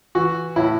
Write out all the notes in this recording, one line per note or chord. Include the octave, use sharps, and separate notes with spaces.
E3 F#4
A2 E4